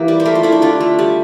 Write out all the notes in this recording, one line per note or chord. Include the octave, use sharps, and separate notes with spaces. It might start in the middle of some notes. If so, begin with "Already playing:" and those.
Already playing: E3 A#3 E4 G4
G3
C5
A3 A#4
F4
A3 E4
D4
D3 F4
A3
G3